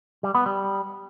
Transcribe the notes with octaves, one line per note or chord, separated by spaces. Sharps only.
G3
B3
G3